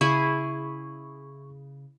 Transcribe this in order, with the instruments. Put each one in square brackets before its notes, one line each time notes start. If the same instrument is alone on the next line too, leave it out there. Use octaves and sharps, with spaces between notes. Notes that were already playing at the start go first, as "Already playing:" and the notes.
[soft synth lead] C#3 [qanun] E4 G#4 [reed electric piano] C#6